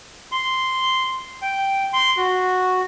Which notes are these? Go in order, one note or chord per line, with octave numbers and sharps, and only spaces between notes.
C6
G5
C6
F#4